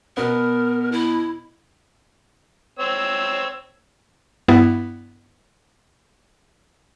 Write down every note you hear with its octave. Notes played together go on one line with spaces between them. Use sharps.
B2 B3 A#4
E4
C4 C#5 E6
G2 B3 E4